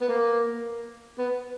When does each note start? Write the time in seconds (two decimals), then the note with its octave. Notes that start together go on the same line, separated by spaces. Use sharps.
0.01 B3
0.08 A#3
1.18 B3